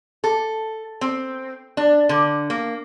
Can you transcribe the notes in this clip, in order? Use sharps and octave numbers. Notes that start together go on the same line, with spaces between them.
A4
C4
D4
D3
A#3